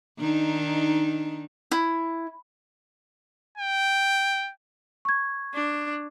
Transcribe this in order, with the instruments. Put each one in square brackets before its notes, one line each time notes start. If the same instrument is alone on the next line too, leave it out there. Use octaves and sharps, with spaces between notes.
[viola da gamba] D#3 D4 D#4
[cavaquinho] E4
[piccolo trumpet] G5
[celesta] C#6 G#6
[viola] D4